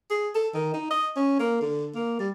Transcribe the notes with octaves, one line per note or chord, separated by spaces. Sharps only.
G#4
A4
D#3
D#4
D#5
C#4
A#3
D3
A#3
G3